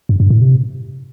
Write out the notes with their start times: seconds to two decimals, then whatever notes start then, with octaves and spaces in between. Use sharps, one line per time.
0.09 G2
0.20 G2
0.30 A2
0.41 C3